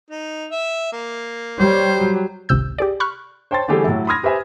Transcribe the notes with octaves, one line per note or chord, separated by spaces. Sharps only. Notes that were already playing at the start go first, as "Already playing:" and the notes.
D#4
E5
A#3
G3 C5 C#5
F#3
G#1 C#2 C3 E6 G6
G4 G#4 D5
B5 C#6 F6 F#6
C5 C#5 G5 A5 C6 A6
D3 E3 G3 A3 G4 G#4
A2 F#3 E4
B5 C6 D#6 F6 G#6 A#6
G4 B4 C5 E5 G#5